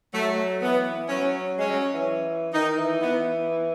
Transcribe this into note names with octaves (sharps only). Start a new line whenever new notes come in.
F#3 A3
E3 B3
F#3 C#4
G#3 C#4
F#3
E3
D#3 D#4
E3
E3 B3